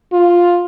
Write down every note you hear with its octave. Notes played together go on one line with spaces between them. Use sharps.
F4